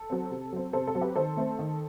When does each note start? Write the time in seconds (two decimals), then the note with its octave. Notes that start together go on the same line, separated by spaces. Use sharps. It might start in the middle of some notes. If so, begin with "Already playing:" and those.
Already playing: A4
0.10 F#3 C4
0.31 C3
0.53 F#3 C4
0.73 C3 A4 C5
0.87 A4
0.95 F#3 C4
1.01 G4 B4
1.15 D#3 A4 C5
1.37 A3 C4
1.59 D#3